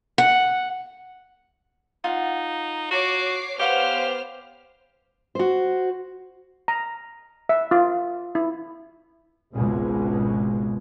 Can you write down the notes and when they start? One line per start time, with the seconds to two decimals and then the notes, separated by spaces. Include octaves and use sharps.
0.18 F#5
2.04 D#4 F4 F#5
2.91 F#4 C#5 D6 C7
3.59 B3 G4 C5 C#5 F5 F#5 F6
5.35 F#4 C5
6.68 A#5
7.49 E5
7.71 F4
8.35 E4
9.54 G#1 C#2 B2 G#3